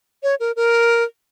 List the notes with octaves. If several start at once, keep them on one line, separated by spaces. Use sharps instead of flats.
C#5
A#4
A#4